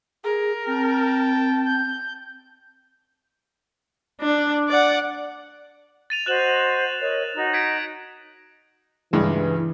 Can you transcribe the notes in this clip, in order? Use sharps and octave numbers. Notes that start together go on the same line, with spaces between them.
G#4 A#4
C4 G5 A5
G6
D4
D5 F#5
A6 D#7 F7
F#4 C5 D#5 F#6 E7 F#7
A#4 C#5 D#5
D#4 F#4
G#6 B6 D7
C#2 G2 E3 G#3